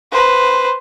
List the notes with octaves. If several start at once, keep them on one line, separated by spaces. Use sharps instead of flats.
B4 C5